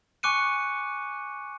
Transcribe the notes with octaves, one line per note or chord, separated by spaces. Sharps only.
G#5 C#6 D6 F#6 C#7 D#7